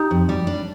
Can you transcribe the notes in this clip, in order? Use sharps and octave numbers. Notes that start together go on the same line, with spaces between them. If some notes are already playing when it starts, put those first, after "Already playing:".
Already playing: D#4 G4
F2
G3
D4